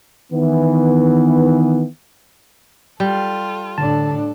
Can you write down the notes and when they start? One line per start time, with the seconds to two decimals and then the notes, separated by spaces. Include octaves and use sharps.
0.32 D#3 E3 B3
3.00 G3 F4 A4
3.78 A2 D3 D4 A4 A5